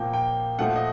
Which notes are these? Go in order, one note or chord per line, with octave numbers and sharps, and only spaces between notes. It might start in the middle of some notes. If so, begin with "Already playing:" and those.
Already playing: A#2 F3 A#3 G5
G5
A#2 F3 A3 F#5
D#5